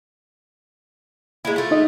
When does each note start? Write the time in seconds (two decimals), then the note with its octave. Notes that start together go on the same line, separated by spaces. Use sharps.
1.45 G#3 A#3 E4
1.56 A3 F4
1.71 D#4 D#5